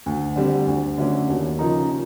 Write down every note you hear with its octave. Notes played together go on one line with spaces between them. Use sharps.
D2
D3 G3 C4
D2
D3 F#3 A3 C#4
D#2
C#3 F3 A#3 D#4
C#3